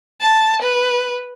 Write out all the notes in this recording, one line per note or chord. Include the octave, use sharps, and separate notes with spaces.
A5
B4